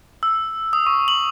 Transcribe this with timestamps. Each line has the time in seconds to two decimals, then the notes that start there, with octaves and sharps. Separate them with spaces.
0.23 E6
0.73 D#6
0.86 C#6
1.08 F#7